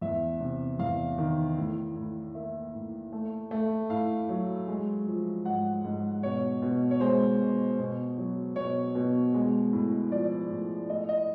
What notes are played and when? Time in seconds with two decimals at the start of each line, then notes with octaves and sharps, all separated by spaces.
0.01 E2 E5
0.40 C3
0.79 E2 F5
1.18 D#3
1.57 A2
1.96 A2
2.35 A#3 E5
2.74 A2
3.12 A3
3.51 A3
3.90 A2 F5
4.29 F#3
4.68 G#3
5.07 F3
5.45 G#2 F#5
5.85 G#2
6.23 B2 C#5
6.62 B2
6.91 C#5
7.00 G#3 C5
7.39 B2
7.79 B2
8.18 F#3
8.56 B2 C#5
8.95 B2
9.34 G#3
9.73 A2
10.12 F3 D5
10.50 A2
10.89 A2 D#5
11.09 D#5